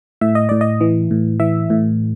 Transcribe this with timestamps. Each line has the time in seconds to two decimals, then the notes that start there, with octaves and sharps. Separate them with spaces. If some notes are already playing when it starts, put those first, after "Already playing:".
0.21 A2 E5
0.35 D#5
0.49 A2 D5
0.61 D#5
0.81 E3
1.11 A2
1.40 E3 E5
1.70 A2